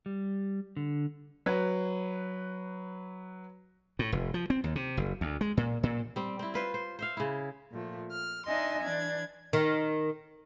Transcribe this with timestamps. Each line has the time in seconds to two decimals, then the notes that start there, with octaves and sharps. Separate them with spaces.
0.06 G3
0.77 D3
1.46 F#3 B4
3.99 A2
4.12 F1
4.34 F3
4.50 C4
4.64 D#2
4.76 C3
4.97 F#1
5.21 D2
5.41 G#3
5.57 A#2
5.83 A#2
6.16 G3 C4
6.39 C4 E4
6.54 F4 B4 C5
6.74 C5
6.99 C5 E5 F5
7.17 C#3 E4
7.73 A#2 F3 A3
8.11 F6
8.46 D4 D#4 D#5 E5 G#5 C6
8.83 E3 D4 G#6
9.53 D#3